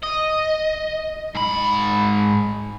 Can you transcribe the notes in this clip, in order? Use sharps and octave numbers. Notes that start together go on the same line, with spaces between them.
D#5
G#2 B5